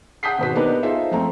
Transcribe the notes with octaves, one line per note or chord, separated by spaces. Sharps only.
F#5 D#6 G6 B6 C7
G#1 B2 B4 C5 B6
B3 D4 D#4 G4 A#4 B4
D#4 F4 G#4 A4 C5 E5
F3 A3 C4 A#5